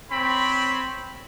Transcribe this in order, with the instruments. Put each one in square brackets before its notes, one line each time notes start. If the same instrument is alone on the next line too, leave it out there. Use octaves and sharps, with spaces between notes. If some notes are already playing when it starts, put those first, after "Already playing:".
[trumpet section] C4 C#5 B5